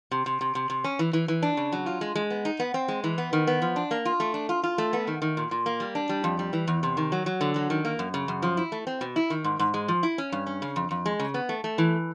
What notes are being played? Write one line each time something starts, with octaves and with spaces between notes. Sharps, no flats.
C3
C3
C3
C3
C3
C#4
E3
E3
E3
D4
C#3
F#3
F4
G#3
G#3
B3
D#4
B3
C4
G#3
E3
B3
D#3
B3
F3
D4
A#3
F4
A3
D4
F4
F4
A3
B3
D#3
D#3
A#2
A#2
A#3
G3
D4
G3
F2
G3
E3
E2
C3
D#3
F#3
F#3
D3
F#3
D#3
A#3
F#2
C#3
F#2
F3
E4
A3
C4
B2
E4
D#3
G#2
G#2
G#3
F3
E4
C#4
G2
C#4
C#3
F2
F2
G#3
C#3
B3
A3
A3
E3